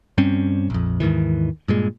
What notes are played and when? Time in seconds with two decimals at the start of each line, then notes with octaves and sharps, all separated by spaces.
0.18 G2 G3 C4 C#4
0.70 A#1 F2
1.00 D#2 G#2 D#3 E3
1.68 G2 A#2 G#3